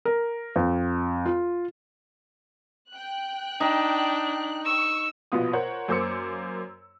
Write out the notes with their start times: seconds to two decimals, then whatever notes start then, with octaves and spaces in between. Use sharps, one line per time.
0.05 A#4
0.56 F2
1.25 F4
2.91 G5 F#6
3.61 D4 D#4
4.65 C#6 E6
5.32 A#1 B2 B3 F4 D#6
5.53 A#4 C5 C#5 F#5
5.88 F#2 A#3 C5 D6 E6 C#7